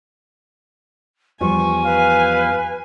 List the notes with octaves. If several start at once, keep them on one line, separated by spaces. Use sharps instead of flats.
E2 F3 G3 G#5 C#6
B4 F5